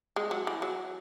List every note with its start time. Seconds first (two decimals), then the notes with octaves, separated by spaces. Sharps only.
0.16 G#3
0.31 F#3
0.47 E3
0.62 F#3